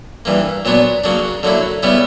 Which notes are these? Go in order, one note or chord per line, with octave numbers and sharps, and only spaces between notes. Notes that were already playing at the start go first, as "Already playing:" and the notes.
G2 E3 A#3
A#2 F#3 B3 D4
C#3 F#3 A#3 D4
D3 F#3 A#3 E4
C#3 G3 B3 E4